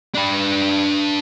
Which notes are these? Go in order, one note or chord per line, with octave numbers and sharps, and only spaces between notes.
D4 B4